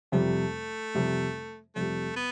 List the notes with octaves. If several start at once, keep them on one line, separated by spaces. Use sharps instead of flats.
F2 C3 G3 A3
F2 C3 G3
F2 C3 G3 A3
B3